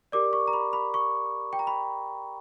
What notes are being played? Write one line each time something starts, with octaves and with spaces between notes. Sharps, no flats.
G4 A#4 D5 D6
C#6
A#5
B5
B5
C#6
G5
A#5
B5